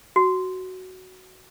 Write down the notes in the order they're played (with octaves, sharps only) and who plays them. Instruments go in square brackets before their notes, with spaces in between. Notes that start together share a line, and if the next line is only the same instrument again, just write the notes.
[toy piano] F#4